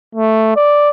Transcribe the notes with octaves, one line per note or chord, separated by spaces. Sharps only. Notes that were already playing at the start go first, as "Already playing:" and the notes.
A3
D5